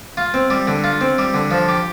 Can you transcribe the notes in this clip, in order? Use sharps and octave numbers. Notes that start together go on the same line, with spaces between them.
F4
C4
G3
D3
F4
C4
G3
D3
F3
G4